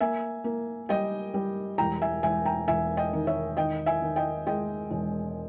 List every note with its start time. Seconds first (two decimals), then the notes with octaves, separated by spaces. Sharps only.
0.01 A#3 E5 G#5
0.44 A#3
0.89 G3 D#5 G5
1.34 G3
1.78 E1 G5 A#5
2.02 E5 G#5
2.23 E1 E5 G#5
2.45 G5 A#5
2.68 E1 E5 G#5
2.97 D#5 G5
3.13 D#3
3.27 C#5 E5
3.57 D#3 D#5 G5
3.86 E5 G#5
4.02 D#3
4.16 D#5 G5
4.47 G#3 D#5 G5
4.91 E1